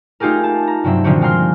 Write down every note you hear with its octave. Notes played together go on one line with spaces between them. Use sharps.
A3 D#4 F4 G4 G#4 A#4
A5
A#5
G2 C3 F#3 C4 E5
A#2 D3 D#3 F3 C4 F#4
G3 G#3 F4 A#5 C6 F6